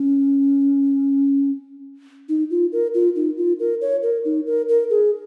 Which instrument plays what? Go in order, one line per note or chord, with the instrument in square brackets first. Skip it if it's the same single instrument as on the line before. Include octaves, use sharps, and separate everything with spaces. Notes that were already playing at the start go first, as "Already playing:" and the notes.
Already playing: [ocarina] C#4
D#4
F4
A#4
F4
D#4
F4
A#4
C#5
A#4
D#4
A#4
A#4
G#4